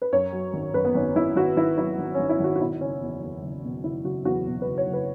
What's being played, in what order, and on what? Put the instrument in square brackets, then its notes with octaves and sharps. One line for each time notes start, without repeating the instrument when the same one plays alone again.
[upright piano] B4
F#2 C#5
F#3
G#1
F#2 B4
B3
G#1 C#4
G#1 E4
G#1 F#4
G#1 E4
F#3 E4
G#1
C#4
G#1
E4
G#1 F#4
F#4
B2 E4
F#1 C#4
E2
E2
F#1
B2
F#1 E4
F#1 F#4
E2 F#4
B2
B4
F#1
C#5
F#1
B4